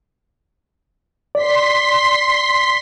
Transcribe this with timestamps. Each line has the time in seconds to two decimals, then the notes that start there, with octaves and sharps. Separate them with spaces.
1.35 D5 C6 B6